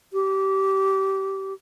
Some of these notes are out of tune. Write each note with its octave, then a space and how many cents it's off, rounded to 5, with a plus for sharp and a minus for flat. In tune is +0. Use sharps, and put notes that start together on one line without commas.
G4 -20